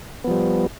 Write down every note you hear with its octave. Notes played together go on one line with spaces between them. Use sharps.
F3 G3 B3